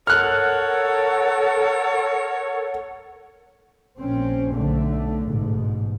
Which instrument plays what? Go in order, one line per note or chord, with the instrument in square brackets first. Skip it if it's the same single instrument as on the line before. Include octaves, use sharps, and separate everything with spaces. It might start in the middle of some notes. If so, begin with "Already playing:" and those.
[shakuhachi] A4 [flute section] A#4 F#5 [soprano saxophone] C#5 [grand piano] F6 F#6
[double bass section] A#1 C4 C#4
B1 D3 A3
A1 G#2 B2